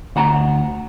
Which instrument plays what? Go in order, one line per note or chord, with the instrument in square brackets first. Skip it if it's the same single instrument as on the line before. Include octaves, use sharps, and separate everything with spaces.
[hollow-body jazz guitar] D2 F#5 A#5